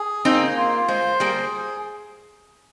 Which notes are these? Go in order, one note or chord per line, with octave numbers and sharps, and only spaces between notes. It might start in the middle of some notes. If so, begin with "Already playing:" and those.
Already playing: G#4
A#3 C4 D#4
F4
G#3 C5
G3 A#3 G#4